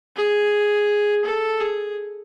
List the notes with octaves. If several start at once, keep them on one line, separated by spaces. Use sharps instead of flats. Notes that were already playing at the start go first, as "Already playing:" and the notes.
G#4
A4
G#4